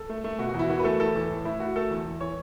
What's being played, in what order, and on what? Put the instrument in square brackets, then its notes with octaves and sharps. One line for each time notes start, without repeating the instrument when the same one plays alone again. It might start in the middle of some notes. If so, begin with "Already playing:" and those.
Already playing: [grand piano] A4
A3
A3
B2 F#4
E2 F#4
E4
E3 F#4
B4
A3 A4
E2 A4
E3
A2
A3 E4
A3 F#4
A3 A4
E2
E2
E3 C#5